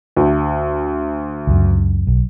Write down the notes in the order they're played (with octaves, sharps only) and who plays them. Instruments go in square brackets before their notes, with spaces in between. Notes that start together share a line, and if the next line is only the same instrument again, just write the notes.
[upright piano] D2
[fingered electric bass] C#2 F#2
B1